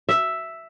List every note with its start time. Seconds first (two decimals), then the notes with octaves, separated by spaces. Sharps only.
0.09 E5